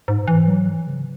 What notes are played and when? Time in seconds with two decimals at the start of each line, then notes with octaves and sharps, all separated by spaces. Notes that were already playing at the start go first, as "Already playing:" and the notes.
0.08 G#2
0.28 E3
0.48 F#3
0.68 E3
0.87 C#3